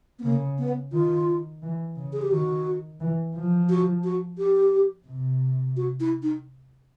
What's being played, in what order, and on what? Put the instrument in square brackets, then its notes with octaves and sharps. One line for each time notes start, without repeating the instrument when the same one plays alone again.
[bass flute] B3
[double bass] C#3 [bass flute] A#3
[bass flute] B3
[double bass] D#3 [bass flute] F4
[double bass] E3
C#3
[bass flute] G#4
G4
[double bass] D#3 [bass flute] F#4
[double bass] E3
F3
[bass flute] F#4
F#4
G4
[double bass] C3
[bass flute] F#4
E4
D#4